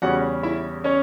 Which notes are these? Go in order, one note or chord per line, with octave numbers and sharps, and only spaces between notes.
E2 C#3 G3 C#4 F#4 F#5
E4 E5
C#4 C#5